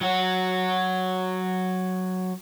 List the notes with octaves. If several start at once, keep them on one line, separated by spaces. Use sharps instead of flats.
F#3 F#4